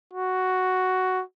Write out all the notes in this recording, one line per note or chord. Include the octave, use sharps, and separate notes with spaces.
F#4